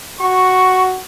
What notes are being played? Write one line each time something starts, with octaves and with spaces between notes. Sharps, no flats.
F#4 C#6